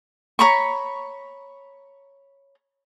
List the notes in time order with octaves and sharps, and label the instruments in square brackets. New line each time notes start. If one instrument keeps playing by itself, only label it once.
[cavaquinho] C#5 A#5 B5 C#6